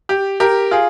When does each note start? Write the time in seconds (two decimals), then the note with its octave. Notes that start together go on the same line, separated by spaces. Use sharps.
0.09 G4
0.40 G4 A#4
0.71 F4 G#4